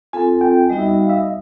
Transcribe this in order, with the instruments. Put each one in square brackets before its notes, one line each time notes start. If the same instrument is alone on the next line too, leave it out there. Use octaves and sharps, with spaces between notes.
[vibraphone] C4 F4 A4 [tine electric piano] G#5
[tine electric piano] G5
G5
[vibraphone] G3 B3 D#4 F#4 [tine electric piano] D#5
[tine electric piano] E5
D#5
F5
E5
D#5